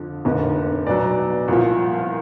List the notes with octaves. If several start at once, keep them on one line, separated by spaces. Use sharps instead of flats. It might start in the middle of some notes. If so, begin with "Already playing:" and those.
Already playing: F2 D3 F3
F1 D#2 D3
B1 B2 F#3 D5
C2 A#2 F3